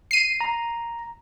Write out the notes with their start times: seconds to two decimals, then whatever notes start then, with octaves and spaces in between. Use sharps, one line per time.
0.11 C7 D#7
0.41 A#5